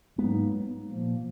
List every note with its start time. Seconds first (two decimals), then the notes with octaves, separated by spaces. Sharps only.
0.18 G#2 F#3 G#3 A#3 B3 D#4
0.90 A#2 F3 A#3